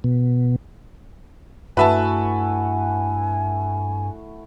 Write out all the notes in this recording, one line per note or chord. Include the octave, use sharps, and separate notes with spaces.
B2
G2 A3 E4 F#4 B4 E5 G#5 A5